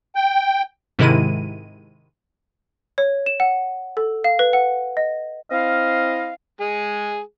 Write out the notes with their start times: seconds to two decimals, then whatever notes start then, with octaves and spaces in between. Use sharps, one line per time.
0.15 G5
0.99 G#2 C3 D#3 G#3 E4 D#7
2.98 C#5
3.26 E7
3.40 F#5
3.97 A4
4.24 F5
4.39 B4
4.53 F#5
4.97 D#5
5.51 C4 E4 D#5 F5
6.61 G#3 G#4